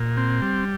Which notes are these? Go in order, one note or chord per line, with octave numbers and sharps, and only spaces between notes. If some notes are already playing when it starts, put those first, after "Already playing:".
Already playing: A#2
C4
G3